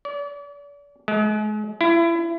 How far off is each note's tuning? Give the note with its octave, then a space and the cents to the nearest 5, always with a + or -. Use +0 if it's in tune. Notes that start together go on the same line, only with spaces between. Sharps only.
D5 -40
G#3 +40
E4 +30